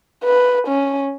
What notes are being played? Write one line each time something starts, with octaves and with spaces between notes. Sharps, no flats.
B4
C#4